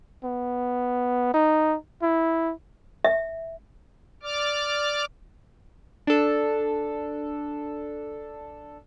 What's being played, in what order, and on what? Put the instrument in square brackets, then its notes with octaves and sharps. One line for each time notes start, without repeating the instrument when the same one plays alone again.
[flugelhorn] B3
D#4
E4
[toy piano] E5
[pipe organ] D5 D6 F6
[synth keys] D4 A4